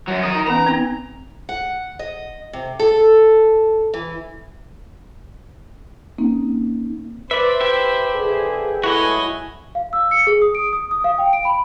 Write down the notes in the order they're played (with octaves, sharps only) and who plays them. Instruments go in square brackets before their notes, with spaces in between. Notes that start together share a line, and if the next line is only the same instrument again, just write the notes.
[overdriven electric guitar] F#2 F#3
A#4 D#5
[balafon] D#4
[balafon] E3 B3 C#4 [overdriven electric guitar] A#5
[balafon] C4 D#4 G#5
[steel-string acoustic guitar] F#5
D#5
C3
A4
E3
[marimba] A#3 C4 C#4 D#4
[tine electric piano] B4 [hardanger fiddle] C5 [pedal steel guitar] D5 E5
[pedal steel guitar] E4 G4 E5
[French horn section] D3 F3 G#4
[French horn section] F#3 G#3 A3 [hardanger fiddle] E4 G#5 [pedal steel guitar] F#4 C#5 D#5
[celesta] F5
E6
C#7
G#4
D#6
D7
D#6
D#6
F5
G5
D7
B5